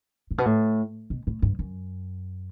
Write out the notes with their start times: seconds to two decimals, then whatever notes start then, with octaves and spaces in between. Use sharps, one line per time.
0.31 A2
0.38 B2
0.46 A2
1.10 B2
1.27 A2
1.42 G2
1.59 F#2